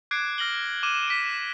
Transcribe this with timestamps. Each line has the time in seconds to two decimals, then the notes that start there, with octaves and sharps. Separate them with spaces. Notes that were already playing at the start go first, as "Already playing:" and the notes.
0.11 D6 F#6 G#6 C7 D7
0.38 F6 A#6 F#7 G7
0.83 D6 F6 D#7 E7
1.08 B6 D7